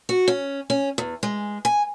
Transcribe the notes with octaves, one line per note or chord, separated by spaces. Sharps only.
F#4
C#4
C#4
E2
G#3
G#5